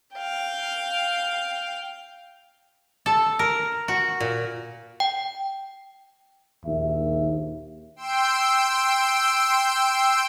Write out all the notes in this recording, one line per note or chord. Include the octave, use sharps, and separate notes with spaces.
F5 G5
A4
A#4
F#4
A#2
G5
A#1 D#2 A#3 E5
G5 C6 E6 D7